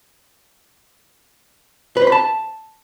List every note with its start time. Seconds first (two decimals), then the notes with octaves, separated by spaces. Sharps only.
1.97 B4
2.02 C5
2.07 B5
2.12 A5